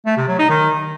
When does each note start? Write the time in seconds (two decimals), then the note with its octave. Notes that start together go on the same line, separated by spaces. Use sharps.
0.06 A3
0.17 C3
0.28 F#3
0.39 D#4
0.50 D#3